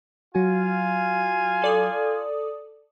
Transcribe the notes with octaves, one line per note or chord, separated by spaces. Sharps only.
F#3 F4 F#4 F5 G#5
A4 D5 D#6